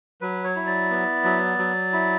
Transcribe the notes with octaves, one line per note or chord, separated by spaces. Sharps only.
F#3 B4
C#5
E4
D5
B3
F#3
F#3
E4